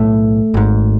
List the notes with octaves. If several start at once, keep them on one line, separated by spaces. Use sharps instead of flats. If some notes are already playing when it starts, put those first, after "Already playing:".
Already playing: B1 A2 A3
G#1 G#2